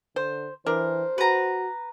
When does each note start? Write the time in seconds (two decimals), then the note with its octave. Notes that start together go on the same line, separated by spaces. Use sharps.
0.16 D3 C5
0.67 E3 D4 A#4 C5
1.18 F#4 B4 A#5